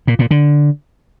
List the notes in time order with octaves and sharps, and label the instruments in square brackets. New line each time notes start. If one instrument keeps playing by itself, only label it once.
[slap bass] A#2
A#2
D3